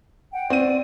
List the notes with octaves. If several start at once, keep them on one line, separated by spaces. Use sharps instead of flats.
F#5 G5
C4 D5 D#7